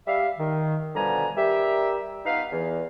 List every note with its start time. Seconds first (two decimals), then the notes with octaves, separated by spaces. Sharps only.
0.07 G3 E5 F5
0.38 D#3
0.95 B2 D3 F3 G3 G#5 A#5
1.36 G3 G4 A#4 E5
2.25 B3 D#4 F4 B4 F5
2.52 E2 E3